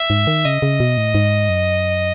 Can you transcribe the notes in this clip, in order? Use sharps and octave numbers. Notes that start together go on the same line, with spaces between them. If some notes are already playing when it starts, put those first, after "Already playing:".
Already playing: E5
G#2
D#3
C#3 D#5
C#3
B2
A2
G#2
F#2